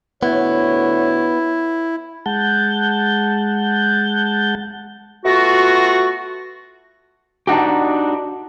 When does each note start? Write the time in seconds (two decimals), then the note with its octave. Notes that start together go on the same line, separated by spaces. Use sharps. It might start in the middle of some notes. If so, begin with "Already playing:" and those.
0.23 D2 B3 E4 C#5
2.26 G#3 F#5 A5 G6
5.24 A3 B3 F4 F#4
7.47 D4 D#4 F#4 G4